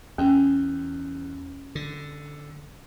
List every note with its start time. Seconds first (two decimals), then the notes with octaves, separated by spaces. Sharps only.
0.18 E2 C#4
1.75 D3